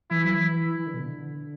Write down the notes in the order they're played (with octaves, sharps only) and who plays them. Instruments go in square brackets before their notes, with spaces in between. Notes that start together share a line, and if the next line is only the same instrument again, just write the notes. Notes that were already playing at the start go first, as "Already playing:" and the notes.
[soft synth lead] E3 [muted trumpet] E4
[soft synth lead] F#3
E3
E3
E3
E3
D3
B2
D3